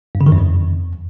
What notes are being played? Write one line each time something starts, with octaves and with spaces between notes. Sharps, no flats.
G2
C#3
D#3
F#2
F2